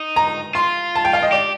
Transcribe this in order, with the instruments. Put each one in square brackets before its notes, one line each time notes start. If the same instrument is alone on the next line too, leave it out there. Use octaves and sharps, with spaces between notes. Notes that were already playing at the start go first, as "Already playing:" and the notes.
Already playing: [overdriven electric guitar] D#4
[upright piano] A#5
[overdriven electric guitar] F4 [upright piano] C6
[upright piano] A5
G5
F5
D#5
[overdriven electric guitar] G4 [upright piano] D5